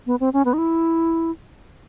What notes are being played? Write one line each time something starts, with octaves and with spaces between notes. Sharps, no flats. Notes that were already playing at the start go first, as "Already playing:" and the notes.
B3
C4
C#4
B3
D#4
E4